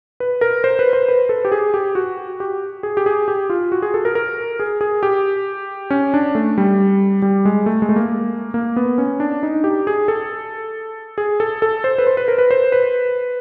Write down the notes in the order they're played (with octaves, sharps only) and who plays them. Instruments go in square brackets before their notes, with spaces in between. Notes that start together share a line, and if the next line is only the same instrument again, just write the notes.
[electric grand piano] B4
A#4
C5
B4
C5
B4
A4
G4
G#4
G4
F#4
G4
G#4
G4
G#4
G4
F4
F#4
G#4
A4
A#4
A#4
G#4
G#4
G4
C#4
D4
A3
G3
G3
G#3
A3
G#3
A3
A#3
A#3
B3
C#4
D4
D#4
G4
G#4
A4
G#4
A4
A4
C5
B4
C5
B4
A#4
B4
C5
B4